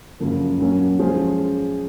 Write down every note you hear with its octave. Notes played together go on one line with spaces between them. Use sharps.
F#2 C#3 F3 A#3
A#2 F#3 A#3 C#4
F3 G#3 C#4 G#4 C5